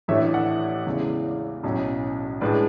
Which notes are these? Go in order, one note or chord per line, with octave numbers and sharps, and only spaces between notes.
A1 A2 E3 A3 D4 C#5 E5
D5 F#5
E2 C#3 E3 G#3
B1 A2 F#3 C#4
A2 G#3 D4 B4 D5